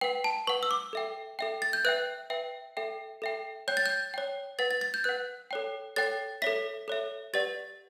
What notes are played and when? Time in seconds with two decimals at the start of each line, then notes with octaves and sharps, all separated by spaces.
0.01 B4 F#5 G5
0.24 A5
0.47 B4 F#5 C#6
0.63 E6
0.71 D6
0.93 A4 E5 G5
1.39 A4 E5 G5
1.62 A6
1.73 G6
1.85 B4 E5 G5 F#6
2.30 B4 E5 G5
2.77 A4 E5 G5
3.22 A4 E5 G5
3.68 C#5 G5 G6
3.77 A6
3.86 G6
4.14 C#5 G5
4.59 B4 F#5 A6
4.71 A6
4.81 A6
4.94 G6
5.04 B4 F#5 F#6
5.51 A4 C#5 G5
5.96 A4 C#5 G5 A6
6.42 A4 C#5 E5 B6
6.88 A4 C#5 E5
7.33 G4 B4 D5 F#5 A6